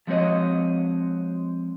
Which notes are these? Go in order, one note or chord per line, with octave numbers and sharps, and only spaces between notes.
F3 G#3 C4 F#4 C#5 D#5